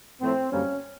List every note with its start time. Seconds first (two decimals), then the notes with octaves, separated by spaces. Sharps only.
0.21 A2 F3 A3 C4
0.50 F#2 D3 G3 A#3 C#4